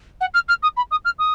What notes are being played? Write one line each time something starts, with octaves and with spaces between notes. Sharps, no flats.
F#5
F6
F6
D#6
B5
D#6
F6
D#6